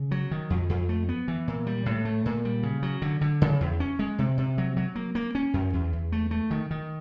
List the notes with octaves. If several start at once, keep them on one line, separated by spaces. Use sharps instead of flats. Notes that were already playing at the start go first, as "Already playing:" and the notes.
Already playing: C#3
F#3
D#3
F2
F2
A3
B3
E3
A#2
G3
A2
A3
A#2
G3
C#3
F#3
D3
D3
C#3
E2
C#4
G#3
C3
C3
F#3
F#3
A#3
A#3
C#4
F#2
E2
E2
A3
A3
D#3
D#3